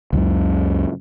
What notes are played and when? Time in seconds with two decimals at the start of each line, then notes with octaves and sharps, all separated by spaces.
0.13 C#2 F#2 C#3